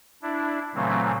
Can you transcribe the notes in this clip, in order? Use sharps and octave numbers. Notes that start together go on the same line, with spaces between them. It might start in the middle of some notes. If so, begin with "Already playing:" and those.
D4 E4
A#2 C#3 E3 F#3 A3 C4